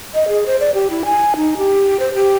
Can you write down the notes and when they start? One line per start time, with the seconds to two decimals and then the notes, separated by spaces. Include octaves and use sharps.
0.14 D#5
0.28 G#4
0.46 C5
0.60 D5
0.74 G4
0.90 E4
1.05 G#5
1.36 D#4
1.57 G4
2.00 C5
2.15 G4